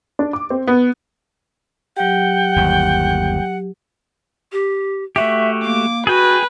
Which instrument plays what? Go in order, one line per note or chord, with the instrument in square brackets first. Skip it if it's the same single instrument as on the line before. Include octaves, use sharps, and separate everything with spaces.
[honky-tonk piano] D4
D6
C4
B3
[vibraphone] F#3 G4 [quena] F#5 [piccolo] G5
[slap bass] G1 D#2
[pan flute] G4
[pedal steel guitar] A3 F#4 G4 [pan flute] E5
[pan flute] A#3 [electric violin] D6
[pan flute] F#4 [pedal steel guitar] G#4 G5 G#5 [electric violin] B4